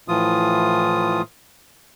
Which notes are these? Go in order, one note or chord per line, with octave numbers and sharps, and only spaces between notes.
A2 E3 F3 F4 D#6